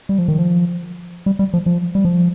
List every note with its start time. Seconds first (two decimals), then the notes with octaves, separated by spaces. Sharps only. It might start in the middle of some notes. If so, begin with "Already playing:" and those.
0.09 G3
0.18 F3
0.28 D#3
0.39 F3
1.26 G3
1.39 G3
1.54 F3
1.66 F3
1.95 G3
2.05 F3